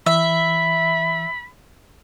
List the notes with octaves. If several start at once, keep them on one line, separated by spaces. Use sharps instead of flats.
E3 E5 B5